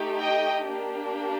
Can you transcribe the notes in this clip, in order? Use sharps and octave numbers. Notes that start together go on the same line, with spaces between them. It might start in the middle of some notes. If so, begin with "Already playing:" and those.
Already playing: A3 D#4 G4
D#5 G5
A#3 D4 G4